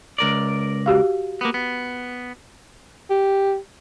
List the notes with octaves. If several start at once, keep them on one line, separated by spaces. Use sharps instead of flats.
C#2 A#4 D5
F#4 G4 F5
A#3 B3
B3
G4